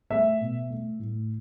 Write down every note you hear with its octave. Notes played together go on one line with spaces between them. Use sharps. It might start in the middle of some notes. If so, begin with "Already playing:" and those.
A3 E5
B2
A3
A2